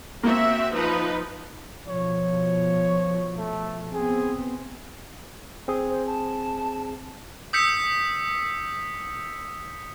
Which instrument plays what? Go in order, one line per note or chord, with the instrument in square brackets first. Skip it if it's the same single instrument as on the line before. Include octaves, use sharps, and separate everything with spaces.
[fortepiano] A#3 [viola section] C4 F#4 E5
[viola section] F3 D#4 B4
[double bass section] B2 F3 [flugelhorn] C#5
[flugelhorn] A3
[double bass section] B3 C4 [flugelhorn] G#4
[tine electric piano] C4 G#4
[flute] C5
A5
[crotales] D#6 E6 G6 B6 C#7